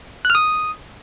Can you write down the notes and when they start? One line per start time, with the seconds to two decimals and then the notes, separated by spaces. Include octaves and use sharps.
0.25 F#6
0.30 F6
0.35 D#6